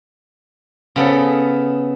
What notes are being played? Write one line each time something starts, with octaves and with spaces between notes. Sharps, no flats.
C#3 B3 A4